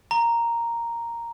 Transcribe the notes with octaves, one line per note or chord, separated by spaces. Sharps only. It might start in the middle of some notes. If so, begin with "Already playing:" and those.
A#5